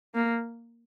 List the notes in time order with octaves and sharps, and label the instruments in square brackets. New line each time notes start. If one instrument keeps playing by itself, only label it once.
[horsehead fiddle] A#3